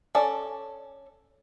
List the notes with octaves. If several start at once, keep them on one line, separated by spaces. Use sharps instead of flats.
C#4 A4 D5